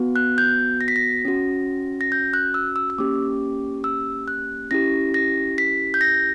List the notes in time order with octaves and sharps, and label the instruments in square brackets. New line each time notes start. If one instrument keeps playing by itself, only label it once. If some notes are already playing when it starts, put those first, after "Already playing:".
Already playing: [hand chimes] B3 F#4
F#6
G6
A#6
B6
A#6
C#4 F#4
A#6
G6
F#6
E6
E6
E6
A#3 C#4 G4 D6
E6
F#6
C#4 E4 G4 A#6
A#6
B6
G6
A#6